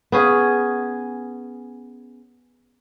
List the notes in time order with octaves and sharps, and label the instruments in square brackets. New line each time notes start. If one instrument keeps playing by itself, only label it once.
[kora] B3 C#4 G#4